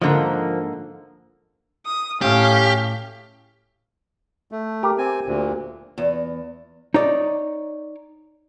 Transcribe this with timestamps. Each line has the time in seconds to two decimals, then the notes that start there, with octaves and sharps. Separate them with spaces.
0.02 G#2 D3 F3 A#3 A#4
1.86 D#6
2.22 A2 C#4 G4 F5
4.52 A3
4.83 G4 A#4
4.98 C4 G#5
5.26 D2 A#2
5.98 E2
6.94 D#4 C#5 D5